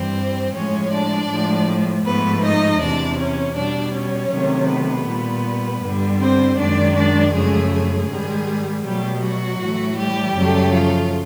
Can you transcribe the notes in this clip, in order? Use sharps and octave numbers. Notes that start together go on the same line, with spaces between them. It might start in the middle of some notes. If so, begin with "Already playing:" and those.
Already playing: G2 E3 G3 C4 C5
A2 F3 G#3 C#4 C#5
D4 D5
A2 F3 G#3
G#2 F3 A3 B3 B4
D#4 D#5
E2 C3 E3 D4 D5
C#4 C#5
B2 G3 D4 D5
C#4 C#5
C3 D#3 F#3 A3
B3 B4
A#2 G3
G2 D3 G3
C4 C5
F#2 D#3 G#3 D4 D5
D4 D5
F#2 C#3 F3 G#3 A3 G#4
G#3 G#4
G#2 D#3 G3
B2 F#3 G3 A3 G4
F#3 F#4
A2 E3 A3
G3 G4
F#2 C#3 F#3 A3
F3 F4